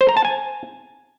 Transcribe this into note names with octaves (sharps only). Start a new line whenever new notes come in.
C5
A#5
A5
G#5